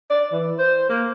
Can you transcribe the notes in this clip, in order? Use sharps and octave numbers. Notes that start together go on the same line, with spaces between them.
D5
E3
C5
A#3